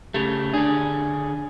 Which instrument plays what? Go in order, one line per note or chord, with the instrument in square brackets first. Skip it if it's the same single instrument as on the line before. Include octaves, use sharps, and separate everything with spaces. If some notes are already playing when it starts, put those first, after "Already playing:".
[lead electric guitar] C#3 A3 [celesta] G4 F7
[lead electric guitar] D3 G#4 [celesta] D4 D5 G#6